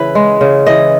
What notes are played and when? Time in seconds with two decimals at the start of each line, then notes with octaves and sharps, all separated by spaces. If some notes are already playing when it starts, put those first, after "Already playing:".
Already playing: C#3 E3 B4
0.15 G#3
0.41 C#3
0.67 E3 D#5